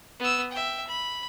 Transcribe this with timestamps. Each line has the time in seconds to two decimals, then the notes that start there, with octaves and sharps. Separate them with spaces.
0.20 B3 E6
0.52 E5 G5
0.88 B5